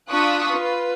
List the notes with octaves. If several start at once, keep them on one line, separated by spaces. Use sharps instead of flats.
D4 F4 C#6 D#6 F#6 B6
F4 B4